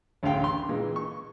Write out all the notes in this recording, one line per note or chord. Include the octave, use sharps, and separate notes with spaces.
A1 D2 C#3 F5 G5
C6
A#2 E3 G#3
C#6